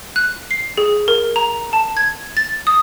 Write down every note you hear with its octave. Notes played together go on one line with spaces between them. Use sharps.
F#6
C7
G#4
A#4
A#5
A5
G#6
A6
D#6